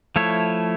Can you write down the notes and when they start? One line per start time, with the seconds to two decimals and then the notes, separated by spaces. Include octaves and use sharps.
0.16 F3 A3 E4 A4 C#5